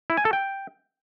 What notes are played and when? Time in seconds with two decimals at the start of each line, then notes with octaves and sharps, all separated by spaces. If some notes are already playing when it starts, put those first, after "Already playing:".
0.10 E4
0.17 G#5
0.25 A4
0.33 G5